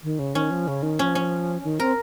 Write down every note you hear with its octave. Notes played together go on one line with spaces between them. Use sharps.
D#3
C#3
D#3 C#4
F3
C#3
D#3
F3 C#4
C#4
D#3
C4 A#4